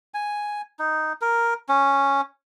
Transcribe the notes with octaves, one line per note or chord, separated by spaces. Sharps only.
G#5
D#4
A#4
C#4